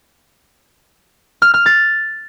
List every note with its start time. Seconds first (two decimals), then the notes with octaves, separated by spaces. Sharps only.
1.42 F6
1.54 F6
1.66 A6